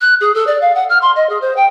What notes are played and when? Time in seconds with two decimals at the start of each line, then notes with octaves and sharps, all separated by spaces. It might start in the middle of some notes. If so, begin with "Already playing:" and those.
0.01 F#6
0.20 G#4
0.34 A4
0.47 D5
0.61 F5
0.75 F#5
0.89 F6
1.01 C6
1.16 D#5
1.29 G#4
1.41 C5
1.56 G5